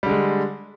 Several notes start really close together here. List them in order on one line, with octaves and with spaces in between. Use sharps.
G3 D3 G#3